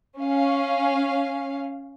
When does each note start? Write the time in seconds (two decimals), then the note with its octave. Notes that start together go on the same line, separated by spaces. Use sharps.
0.19 C#4 F5